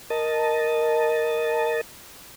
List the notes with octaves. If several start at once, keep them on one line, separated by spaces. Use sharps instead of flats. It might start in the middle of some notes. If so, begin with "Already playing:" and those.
A#4 D#5 A5